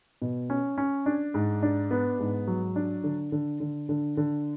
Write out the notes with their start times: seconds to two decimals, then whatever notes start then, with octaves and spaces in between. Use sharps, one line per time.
0.22 B2
0.50 C#4
0.78 C#4
1.06 D4
1.34 G#2
1.62 D4
1.91 B3
2.19 G#2
2.47 F#3
2.76 D4
3.04 D3
3.32 D3
3.60 D3
3.89 D3
4.17 D3